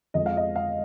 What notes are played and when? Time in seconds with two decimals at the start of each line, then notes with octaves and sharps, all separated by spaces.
0.14 F2 F3 G#3 D#5
0.26 F5
0.37 D#5
0.56 F5